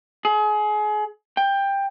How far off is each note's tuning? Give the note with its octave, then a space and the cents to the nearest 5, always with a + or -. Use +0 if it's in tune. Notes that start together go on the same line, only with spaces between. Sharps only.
G#4 +30
G5 +15